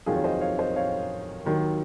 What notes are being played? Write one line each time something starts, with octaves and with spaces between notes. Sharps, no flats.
F1 D#2 D#3 F#3 F4 G#4
C#5
C5 D#5
C#5 F5
C5 D#5
C#5 F5
D#2 D#3 F#3